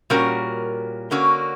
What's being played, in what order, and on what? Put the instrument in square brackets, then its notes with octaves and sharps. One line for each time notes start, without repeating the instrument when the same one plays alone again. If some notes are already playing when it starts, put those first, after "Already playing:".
[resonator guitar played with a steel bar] A#2 G3 C#4 F#4 A#4
D3 A#3 C#4 F#4